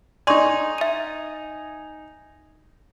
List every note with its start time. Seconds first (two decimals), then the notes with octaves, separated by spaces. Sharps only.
0.27 D#4 D5 G#5 C6 C#6
0.78 E5 D#7